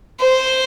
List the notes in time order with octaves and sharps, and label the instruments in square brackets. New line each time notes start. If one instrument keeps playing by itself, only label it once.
[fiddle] C5